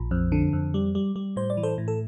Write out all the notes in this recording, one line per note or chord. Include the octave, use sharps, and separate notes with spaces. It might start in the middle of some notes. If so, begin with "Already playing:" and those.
Already playing: A#1
F2
D3
F2
G3
G3
G3
A2 C5
D5
E3
A4 C5
A2
A4